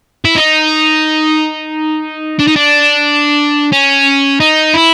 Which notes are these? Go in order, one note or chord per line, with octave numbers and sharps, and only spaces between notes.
E4
D#4
D4
D#4
D4
C#4
D#4
E4